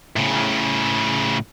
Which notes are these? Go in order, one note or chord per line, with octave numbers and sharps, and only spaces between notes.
A2 C#3